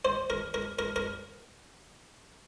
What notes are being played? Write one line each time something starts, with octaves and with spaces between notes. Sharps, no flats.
C5
A#4
A#4
A#4
A#4